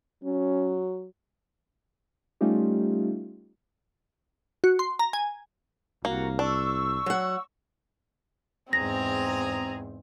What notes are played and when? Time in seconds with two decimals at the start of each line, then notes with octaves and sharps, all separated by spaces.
0.24 F#3 C#4
2.41 G3 A3 C#4 D#4 F4 G4
4.64 F#4
4.79 C6
4.99 A#5
5.13 G#5
6.05 C2 A#3 F#4 A#5
6.39 D4 C#6 E6
7.06 F#3 F#5
8.73 E2 G#2 C4 G#4 A#5 A#6